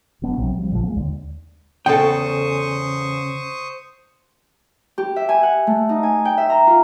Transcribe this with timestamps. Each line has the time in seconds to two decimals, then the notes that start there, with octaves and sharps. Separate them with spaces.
0.22 F1 F#2 B3 D4
0.37 B1 C3 F#3 C4
0.56 F3 G3
0.70 A#1 F2 E3 F3
0.84 G#3 A#3 B3
0.96 D#2 D3
1.86 E2 C#3 A4 C5 G5 C#6 D#6
4.98 G4
5.16 E5
5.29 G#5
5.43 F#5
5.67 A3
5.89 D#4
6.03 G#5
6.25 G5
6.38 E5
6.50 A#5
6.67 F4